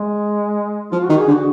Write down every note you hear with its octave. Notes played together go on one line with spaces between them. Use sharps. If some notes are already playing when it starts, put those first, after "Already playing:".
Already playing: G#3
F3 F4
D#3 F#4
G#4
D3
F#4